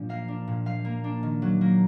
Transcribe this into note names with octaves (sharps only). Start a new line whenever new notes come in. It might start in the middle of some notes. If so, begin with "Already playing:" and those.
Already playing: A#2 F3 D4
A#3 F5
D4
A#2
F3 F5
A#3
D4
D#3
F#3
A#3